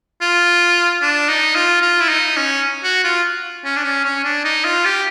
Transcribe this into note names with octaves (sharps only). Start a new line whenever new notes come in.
F4
D4
D#4
F4
F4
E4
D#4
C#4
F#4
F4
C#4
D4
C#4
C#4
D4
D#4
F4
G4